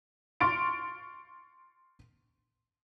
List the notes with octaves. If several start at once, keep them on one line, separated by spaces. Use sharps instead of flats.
C6 C#6 F6 A6 D7